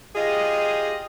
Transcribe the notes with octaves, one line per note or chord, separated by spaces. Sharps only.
F4 G4 G#4 D#5